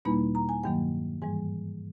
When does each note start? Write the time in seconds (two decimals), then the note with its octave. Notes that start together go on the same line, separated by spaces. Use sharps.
0.05 E2 B2 G3 A#3 D#4 B5
0.35 A#5
0.49 G#5
0.63 G2 D#3 F#3 A#3 G5
1.22 G#2 E3 G3 G#5